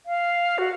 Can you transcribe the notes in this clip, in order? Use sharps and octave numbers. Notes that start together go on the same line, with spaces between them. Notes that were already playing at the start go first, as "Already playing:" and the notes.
F5
F#4